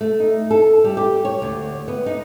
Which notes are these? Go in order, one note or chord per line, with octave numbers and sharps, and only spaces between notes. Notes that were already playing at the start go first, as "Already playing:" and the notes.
A3
D#4
A4
G3
G4
C#5
D2
B3
D#4